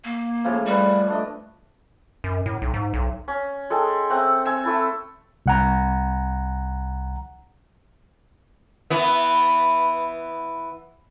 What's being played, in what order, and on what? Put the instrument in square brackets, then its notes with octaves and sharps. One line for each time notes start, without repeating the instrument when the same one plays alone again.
[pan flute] A#3
[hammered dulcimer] A2 C#3 F3
[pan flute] G3 [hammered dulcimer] B4 D5
[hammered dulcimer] A3 D4 D#5
[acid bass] F#2
A2
B1
G#2
B1
[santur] C#4
G#3 A4 G5
A3 C4 F#5
C4 G#5 E6
A3 E4 A5
[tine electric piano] C2 F#5 A#5
[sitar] E3 B3